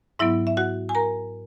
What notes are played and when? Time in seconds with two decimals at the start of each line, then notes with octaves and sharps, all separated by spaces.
0.19 G#2 F#3 B3 E4 E5
0.47 E5
0.57 F#4 F#5
0.89 G#5
0.95 A#4 A#5